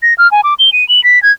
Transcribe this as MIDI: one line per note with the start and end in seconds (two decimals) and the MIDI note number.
0.03 0.14 94
0.18 0.30 89
0.32 0.41 80
0.44 0.54 86
0.59 0.70 103
0.73 0.87 99
0.89 1.03 102
1.04 1.22 95
1.23 1.32 92